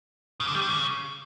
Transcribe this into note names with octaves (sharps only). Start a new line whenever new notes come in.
C#3
D3
G3
D3
C#3